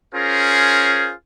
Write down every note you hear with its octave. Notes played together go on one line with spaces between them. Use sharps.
C#4 F4 G#4 A#4 C5